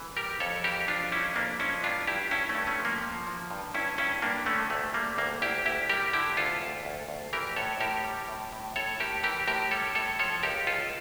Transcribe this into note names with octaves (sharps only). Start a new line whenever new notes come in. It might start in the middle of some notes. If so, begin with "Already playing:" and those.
Already playing: E3
G3 G4 A#4
F2 A4 C#5
E3 G4 A#4
F2 D4 F4
G3 C#4 E4
F2 A#3 D4
F3 C#4 E4
G2 D4 F4
G2 E4 G4
G2 C#4 E4
A3 C#4
G2
A3 C#4
F3
A#3
F3
F3
G2
G2 C#4 E4
G2 C#4 E4
G2 A#3 D4
D3 A3 C#4
D2 A3
G3 A#3
D2 A#3
D2 E4 G4
D2 E4 G4
G3 G4 A#4
D3 E4 G4
D2 F4 A4
D2
D2
D2
E3 G4 A#4
A2 A4 C#5
A2 G4 A#4
G3
A2
A2
A2 A4 C#5
A2 G4 A#4
E3 G4 A#4
A2 G4 A#4
G3 A4 C#5
A2 A4 C#5
F3 A4 C#5
C#2 G4 A#4
C#2 F4 A4